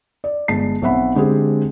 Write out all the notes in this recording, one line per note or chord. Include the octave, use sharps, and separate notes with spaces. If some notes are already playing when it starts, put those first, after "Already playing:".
D5
G1 G#3 A5 C7
B1 C4 E5 F#5 B5
D3 G#3 C4 G4 G#4